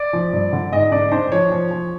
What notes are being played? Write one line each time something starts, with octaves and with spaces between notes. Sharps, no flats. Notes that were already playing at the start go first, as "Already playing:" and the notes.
Already playing: D5
F3
G2
D3
G#2 D#5
D4 D5
D4 C5
F3 C#5
F3
F3